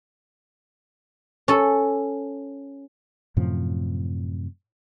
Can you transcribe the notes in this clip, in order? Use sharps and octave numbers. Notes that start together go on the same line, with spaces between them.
C#4 A4
F#2 A2 C3 F3